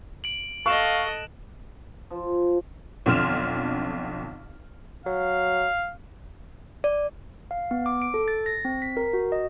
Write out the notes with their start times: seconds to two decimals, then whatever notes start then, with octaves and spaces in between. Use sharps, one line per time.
0.24 D7 F#7
0.66 A4 D#5 F5 C#6 F#6 D7 E7
2.11 F3
3.06 B1 F2 D3 C6 F6 E7
5.06 F#3 F5
6.84 D5
7.51 F5
7.71 B3
7.86 D6
8.02 D7
8.14 A4
8.28 A6
8.46 A#6
8.65 C4
8.82 B6
8.97 A#4
9.13 F#4
9.32 D#5